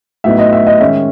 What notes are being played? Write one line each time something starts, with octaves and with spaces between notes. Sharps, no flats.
A2 F#3 B3 D#4 E5
D#5
E5
D#5
D#3 G#3 C#4 E5